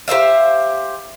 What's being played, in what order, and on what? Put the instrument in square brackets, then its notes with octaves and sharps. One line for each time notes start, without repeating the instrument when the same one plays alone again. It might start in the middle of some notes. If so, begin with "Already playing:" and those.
[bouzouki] G4 C5 E5 F5